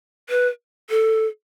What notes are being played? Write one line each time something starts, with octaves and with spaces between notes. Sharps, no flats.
B4
A4